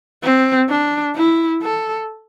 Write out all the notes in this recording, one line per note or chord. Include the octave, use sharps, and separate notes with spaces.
C4
D4
E4
A4